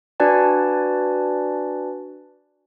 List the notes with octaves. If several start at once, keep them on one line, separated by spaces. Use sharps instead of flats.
D4 F#4 B4 D5 G#5 A5